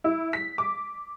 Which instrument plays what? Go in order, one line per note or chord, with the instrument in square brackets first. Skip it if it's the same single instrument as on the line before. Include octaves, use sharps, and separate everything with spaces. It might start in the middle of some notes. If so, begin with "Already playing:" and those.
[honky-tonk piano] E4
B6
D6